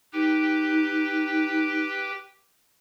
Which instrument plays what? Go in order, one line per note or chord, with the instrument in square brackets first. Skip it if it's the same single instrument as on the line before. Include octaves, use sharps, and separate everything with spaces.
[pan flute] D#4 [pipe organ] G4 B4 G5